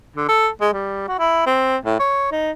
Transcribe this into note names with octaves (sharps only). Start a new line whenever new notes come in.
D3
A4
G#3
G3
F#4
E4
C4
A2
C#5
D#4